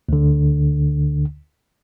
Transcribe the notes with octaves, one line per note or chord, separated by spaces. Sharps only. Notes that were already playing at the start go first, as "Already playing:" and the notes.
D2 D3